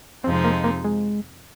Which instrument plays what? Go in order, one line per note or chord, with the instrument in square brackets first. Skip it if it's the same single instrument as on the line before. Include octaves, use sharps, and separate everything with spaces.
[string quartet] F2 C3 F3 G#3 D#4 [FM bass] C4
[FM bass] A#3
A#3
G#3